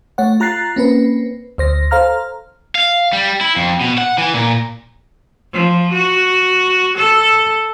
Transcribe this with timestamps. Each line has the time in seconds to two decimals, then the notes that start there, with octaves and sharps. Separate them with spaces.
0.18 A3 C#5 F#5
0.40 F4 A#5 F#6 A6 C7
0.76 A#3 C4 C#4 B4
1.58 D2 C5 A#6
1.91 A4 C5 F5 A#5 F6
2.75 F5
3.13 G3
3.41 E4
3.56 F2
3.81 B2
3.98 F#5
4.18 E3
4.34 A#2
5.53 F3
5.93 F#4
6.97 A4